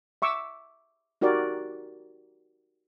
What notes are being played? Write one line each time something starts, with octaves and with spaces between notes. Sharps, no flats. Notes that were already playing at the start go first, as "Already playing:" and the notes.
E5 C#6 D6 E6
D#4 F#4 G4 A#4 D5